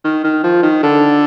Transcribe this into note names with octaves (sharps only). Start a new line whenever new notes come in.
D#3
D#3
F3
D#3
D3